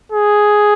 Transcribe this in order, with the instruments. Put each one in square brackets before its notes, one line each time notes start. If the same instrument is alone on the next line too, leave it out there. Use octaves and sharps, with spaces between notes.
[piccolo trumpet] G#4